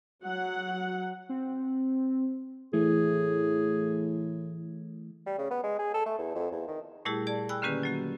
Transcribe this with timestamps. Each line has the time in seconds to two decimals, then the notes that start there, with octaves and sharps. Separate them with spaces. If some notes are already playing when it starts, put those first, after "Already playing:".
0.24 F#3 F#5
1.29 C4
2.73 A2 E3 A3 G#4
5.26 G3
5.38 C#3
5.51 B3
5.63 G#3
5.79 G#4
5.94 A4
6.06 A3
6.18 E2
6.35 F2
6.51 E2
6.68 D#3
7.05 A#2 G3 A3 E4 G4 G#4
7.27 G#4 D5 A5
7.49 G5 G#5 B5 E6 F#6
7.62 D3 D#3 A#3 C#4 G4 B4
7.83 F#3 A#3 F#4